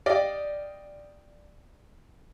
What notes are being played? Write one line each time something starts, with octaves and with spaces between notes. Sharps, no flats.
G4 D5 D#5 F5